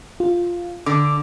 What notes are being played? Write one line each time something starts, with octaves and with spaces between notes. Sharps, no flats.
F4
D3 D6